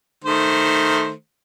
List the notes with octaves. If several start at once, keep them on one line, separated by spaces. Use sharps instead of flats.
D#3 A3 C5